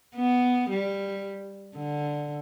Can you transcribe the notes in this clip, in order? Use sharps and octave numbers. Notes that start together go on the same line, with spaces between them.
B3
G3
D3